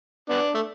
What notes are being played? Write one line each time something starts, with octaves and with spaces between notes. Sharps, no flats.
B3 D4
A3